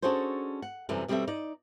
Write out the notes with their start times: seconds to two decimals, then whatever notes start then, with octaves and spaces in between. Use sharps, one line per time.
0.02 C#4 D4 F#4 G#4 A4 C5
0.62 F#5
0.89 F#2 C3 E3 G3 A4
1.08 B2 G3 C4 G4 A4 E5
1.28 D#4 D5